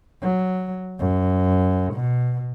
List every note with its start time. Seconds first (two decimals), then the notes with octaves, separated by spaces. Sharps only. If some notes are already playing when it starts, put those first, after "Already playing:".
0.21 F#3
0.99 F#2
1.93 B2